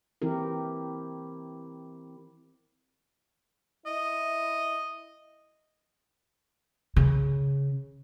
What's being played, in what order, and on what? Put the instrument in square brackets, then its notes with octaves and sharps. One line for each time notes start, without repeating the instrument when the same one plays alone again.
[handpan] E3 C4 E4 G4 A#4
[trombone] E4 [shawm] D#5
[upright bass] C#3